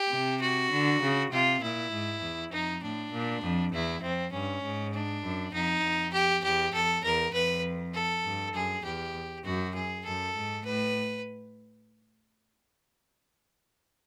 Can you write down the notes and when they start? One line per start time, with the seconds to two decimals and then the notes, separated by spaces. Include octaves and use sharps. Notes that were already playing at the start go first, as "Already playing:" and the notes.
Already playing: G4
0.11 C3
0.41 F#4
0.71 D3
1.02 C#3
1.32 C3 F4
1.62 A#2 E4
1.92 G#2
2.22 E2
2.52 F2 D#4
2.82 A2 D4
3.13 A#2
3.43 F2
3.73 E2 E4
4.02 F2 C4
4.32 G2 C#4
4.63 G#2
4.94 D4
5.23 F#2
5.53 F2 D#4
5.83 F2
6.13 G4
6.43 E2 G4
6.73 F2 A4
7.03 E2 A#4
7.33 F2 B4
7.94 A4
8.25 G2
8.54 F#2 G#4
8.84 E2 G4
9.45 F#2 F#4
9.74 G#4
10.05 F#2 A4
10.35 G#2
10.65 A2 B4